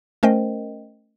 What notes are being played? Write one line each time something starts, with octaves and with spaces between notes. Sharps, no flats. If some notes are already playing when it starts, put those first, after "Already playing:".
A3 C#4 A#4 C5 D#5 G5